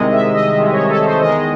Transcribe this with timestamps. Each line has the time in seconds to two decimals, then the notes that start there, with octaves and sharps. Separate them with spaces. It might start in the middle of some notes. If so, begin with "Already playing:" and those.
Already playing: C2 C3 D#3 G#3 D#5
0.12 E5
0.34 D#5
0.56 C2 C3 D#3 G#3
0.72 C#5
0.89 A4
1.05 C5
1.21 E2 D#3 G#3 D#5